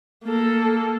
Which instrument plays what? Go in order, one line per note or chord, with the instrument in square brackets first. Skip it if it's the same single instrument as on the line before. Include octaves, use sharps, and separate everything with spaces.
[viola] A#3 A4